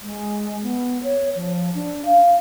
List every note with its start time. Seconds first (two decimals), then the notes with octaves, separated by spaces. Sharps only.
0.03 G#3
0.63 B3
1.03 C#5
1.35 F3
1.75 D4
2.05 F5